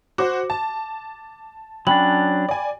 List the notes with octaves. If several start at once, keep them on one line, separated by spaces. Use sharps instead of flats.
F#4 C5 D6
A5
F#3 C#4 D4 G5 B5 F#7
D5 G#5